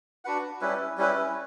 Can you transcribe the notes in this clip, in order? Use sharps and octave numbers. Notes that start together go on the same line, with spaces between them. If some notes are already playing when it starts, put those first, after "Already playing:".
D4 F#4 B4 F#5
G3 C#4 E4 B4
G3 C#4 E4 B4